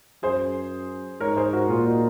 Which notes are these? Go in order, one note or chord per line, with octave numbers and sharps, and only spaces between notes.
F#2 G#4 C5
G#2 A#4 C#5
G#4 C5
F#4 A#4
A#2 F4 G#4
D#4 F#4